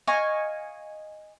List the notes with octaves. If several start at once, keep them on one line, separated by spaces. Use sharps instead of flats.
D#5 F5 G#5 C#6